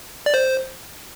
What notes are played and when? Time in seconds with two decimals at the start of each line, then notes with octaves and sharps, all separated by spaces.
0.26 D5
0.34 C5